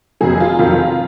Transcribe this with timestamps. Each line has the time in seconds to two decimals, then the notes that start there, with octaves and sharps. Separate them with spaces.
0.21 F1 F2 D#3 F#3 G#4
0.40 F4
0.59 F1 F2 D#3 F#3 F4